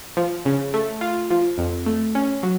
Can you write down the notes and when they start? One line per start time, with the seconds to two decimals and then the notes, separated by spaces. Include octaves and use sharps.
0.17 F3
0.45 C#3
0.74 A3
1.01 F4
1.30 F3
1.58 F2
1.86 A3
2.15 C#4
2.43 F#3